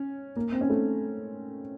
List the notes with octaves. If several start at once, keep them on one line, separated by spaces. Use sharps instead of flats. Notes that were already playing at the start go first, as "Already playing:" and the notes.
Already playing: C#4
A#3
C4
C#4
A3